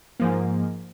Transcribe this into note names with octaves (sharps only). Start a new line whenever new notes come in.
G#2 F3 A#3